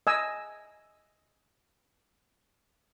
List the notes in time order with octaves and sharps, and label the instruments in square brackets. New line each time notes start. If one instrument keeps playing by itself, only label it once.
[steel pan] D#5 G#5 E6